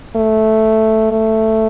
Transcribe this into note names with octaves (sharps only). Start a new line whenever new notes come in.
A3
A3